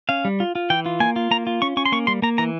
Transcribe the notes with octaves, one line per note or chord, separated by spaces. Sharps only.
C#4 F5
G3
F4
F4
E3 G5
F4
A#3 G#5
F4
A#3 A#5
F4
C#4 C#6
C#4 C#6
C6
A#3 C#6
G3 C6
A#3 A#5
E3 A#5